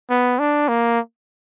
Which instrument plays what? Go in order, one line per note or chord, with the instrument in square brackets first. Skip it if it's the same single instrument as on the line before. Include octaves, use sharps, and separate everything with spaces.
[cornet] B3
D4
A#3